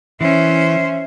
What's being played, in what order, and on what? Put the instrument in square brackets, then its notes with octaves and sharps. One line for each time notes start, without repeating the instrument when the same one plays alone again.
[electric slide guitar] E3 [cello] C#4 C5 [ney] E5